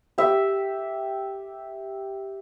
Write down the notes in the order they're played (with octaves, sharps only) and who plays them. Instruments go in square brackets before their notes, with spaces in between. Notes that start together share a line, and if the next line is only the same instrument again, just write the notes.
[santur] G4 E5